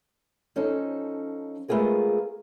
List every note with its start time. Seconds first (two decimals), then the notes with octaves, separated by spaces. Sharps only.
0.56 F3 C#4 D#4 A4
1.68 G#3 A3 B3 F4 G#4 A#4